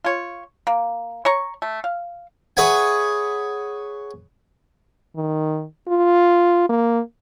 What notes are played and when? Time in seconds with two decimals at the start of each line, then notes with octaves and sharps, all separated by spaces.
0.04 F4 C#5
0.67 A#3
1.25 C#5 A#5 C#6
1.62 A3
1.84 F5
2.57 G#4 B4 C#5 E5 F#5 G#5
5.16 D#3
5.88 F4
6.69 A#3